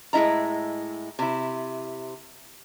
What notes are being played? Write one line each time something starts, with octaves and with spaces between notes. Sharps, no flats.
A2 G#3 E4 D#5 A#5
C3 E4